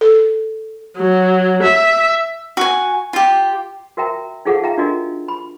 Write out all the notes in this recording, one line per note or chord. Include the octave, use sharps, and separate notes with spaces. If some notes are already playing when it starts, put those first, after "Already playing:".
A4
F#3
E5
F#4 G#5
F4 G4
F#4 A#4 E5 G5 A#5
D#4 F4 G#4 A4 F5 F#5
E5 F5 G5 A#5
D4 F4 F#4 A#4 D#5 G#5
B5